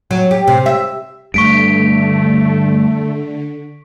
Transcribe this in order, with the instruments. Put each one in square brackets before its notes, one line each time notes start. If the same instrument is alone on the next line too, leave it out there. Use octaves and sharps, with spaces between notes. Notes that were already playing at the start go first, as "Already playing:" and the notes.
[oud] F#3
G4
C3
E5
[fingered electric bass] G2 [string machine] D3 [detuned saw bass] A3 [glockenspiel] C#6 B6 D7